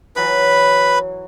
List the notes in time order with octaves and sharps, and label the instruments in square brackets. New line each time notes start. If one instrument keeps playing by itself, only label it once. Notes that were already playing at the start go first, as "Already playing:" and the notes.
[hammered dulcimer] E3 F#3 [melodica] B4 B5